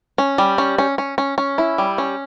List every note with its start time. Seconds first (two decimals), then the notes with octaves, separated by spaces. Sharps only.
0.18 C#4
0.38 G3
0.58 C#4
0.78 C#4
0.98 C#4
1.18 C#4
1.38 C#4
1.58 E4
1.78 G3
1.98 C#4